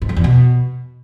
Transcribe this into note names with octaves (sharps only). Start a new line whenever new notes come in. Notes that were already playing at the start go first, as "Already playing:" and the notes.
G#2
F2
E2
B2